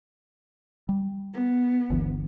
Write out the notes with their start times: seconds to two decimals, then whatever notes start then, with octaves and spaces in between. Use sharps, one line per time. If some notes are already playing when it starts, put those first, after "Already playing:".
0.89 G3
1.34 B3
1.90 G1 D2 E3